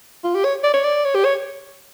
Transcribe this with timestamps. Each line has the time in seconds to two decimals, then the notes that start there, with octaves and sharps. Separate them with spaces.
0.24 F4
0.35 G4
0.45 C#5
0.64 D5
0.74 C#5
0.84 D5
1.05 C#5
1.15 G4
1.25 C#5